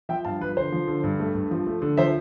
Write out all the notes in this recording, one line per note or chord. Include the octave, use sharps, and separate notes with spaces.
F3 E5 G5
G2 F5 A5
F3 B4
D3 C5
F3
D3
G2
A3
G2
F3
A3
D3
F3 C5 E5